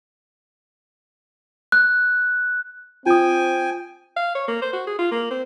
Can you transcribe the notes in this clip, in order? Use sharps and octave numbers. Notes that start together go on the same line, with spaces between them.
F#6
C4 F4 G5 G#5 D#6
F5
C#5
A#3
C5
F#4
G#4
F4
A#3
C4